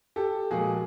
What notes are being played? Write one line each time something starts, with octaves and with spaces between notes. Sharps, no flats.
G4 A4
A#2 F3 G#3 F#4 G#4